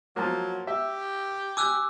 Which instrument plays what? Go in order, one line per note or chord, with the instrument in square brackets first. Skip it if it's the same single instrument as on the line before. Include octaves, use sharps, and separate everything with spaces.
[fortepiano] F3 A#3 [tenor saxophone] F#3
[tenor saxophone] G4 [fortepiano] E5
[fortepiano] G#5 [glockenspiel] D6 E6 F#6